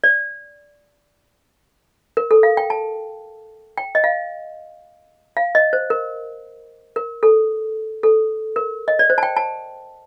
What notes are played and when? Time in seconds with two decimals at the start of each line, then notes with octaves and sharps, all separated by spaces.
0.04 D5
2.17 A#4
2.31 A4
2.43 F5
2.57 G5
2.70 A5
3.78 G5
3.95 D#5
4.04 F5
5.37 F5
5.55 D#5
5.73 C5
5.90 A#4
6.96 A#4
7.23 A4
8.03 A4
8.56 A#4
8.88 D#5
8.99 D5
9.10 C5
9.18 A5
9.23 G5
9.36 A5